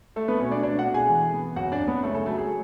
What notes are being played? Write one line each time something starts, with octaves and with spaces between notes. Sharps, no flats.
A3 A4
B3 B4
B2 C#4 C#5
D4 D5
A3 D4 D5
F#4 F#5
B2
G#4 G#5
E3
B3
F#2 F#4 F#5
D4 D5
F#2
B3 B4
C#3 A3 A4
A3 A4
F#3 A3 A4
G#4